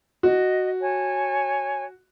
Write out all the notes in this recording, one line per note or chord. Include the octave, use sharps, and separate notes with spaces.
F#4 D#5
C#5 G#5 A5